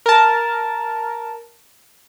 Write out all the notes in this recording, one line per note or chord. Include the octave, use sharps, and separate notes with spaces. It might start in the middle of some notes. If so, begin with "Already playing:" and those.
A#4 A5